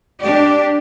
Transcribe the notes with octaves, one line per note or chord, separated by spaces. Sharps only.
D4 G4 D5